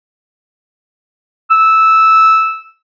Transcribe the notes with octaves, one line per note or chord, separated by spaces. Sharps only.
E6